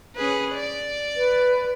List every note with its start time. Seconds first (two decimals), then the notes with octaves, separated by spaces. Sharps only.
0.16 C#4 G#4 B4
0.55 D5
1.16 B4